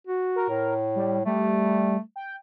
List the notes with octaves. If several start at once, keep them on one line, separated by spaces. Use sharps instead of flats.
F#4
A#4
A2
G3
G3 A3
G5